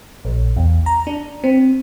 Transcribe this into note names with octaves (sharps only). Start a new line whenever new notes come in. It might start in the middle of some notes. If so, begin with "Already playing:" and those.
A#1
E2
A#5
D4
C4